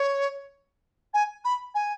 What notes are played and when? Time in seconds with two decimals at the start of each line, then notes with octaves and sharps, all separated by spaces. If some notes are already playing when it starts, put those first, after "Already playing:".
Already playing: C#5
1.14 G#5
1.44 B5
1.74 G#5